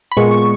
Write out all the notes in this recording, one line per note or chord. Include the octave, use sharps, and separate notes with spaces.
B5
A#2 G#3 B3 C#6
C#6